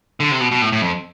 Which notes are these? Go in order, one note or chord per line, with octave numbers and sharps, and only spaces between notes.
D3
C3
B2
B2
A2
A2
F2